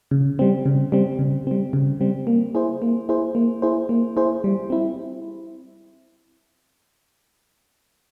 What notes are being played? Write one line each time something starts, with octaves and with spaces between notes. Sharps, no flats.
C#3
G3 C4
C#3
G3 C4
C#3
G3 C4
C#3
G3 C4
A#3
E4 G#4 C5
A#3
E4 G#4 C5
A#3
E4 G#4 C5
A#3
E4 G#4 C5
G3
C4 E4